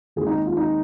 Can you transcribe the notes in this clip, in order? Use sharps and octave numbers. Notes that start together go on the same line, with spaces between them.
D#2 D#3 G#3 C4 G#4
D#4
F4
D#4